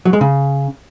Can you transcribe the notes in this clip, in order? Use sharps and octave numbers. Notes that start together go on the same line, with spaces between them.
F#3
G#3
C#3